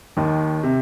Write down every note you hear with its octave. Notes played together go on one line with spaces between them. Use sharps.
D#2 D#3
C3